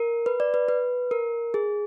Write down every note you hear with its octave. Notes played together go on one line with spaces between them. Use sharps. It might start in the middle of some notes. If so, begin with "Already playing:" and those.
Already playing: A#4
B4
D5
B4
B4
A#4
G#4